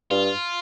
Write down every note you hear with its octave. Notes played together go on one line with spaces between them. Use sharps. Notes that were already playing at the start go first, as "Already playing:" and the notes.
G2 F4